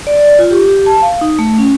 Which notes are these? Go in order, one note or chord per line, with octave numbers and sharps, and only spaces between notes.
D5
D5
F4
G4
G4
A5
F5
D#4
A3
C#4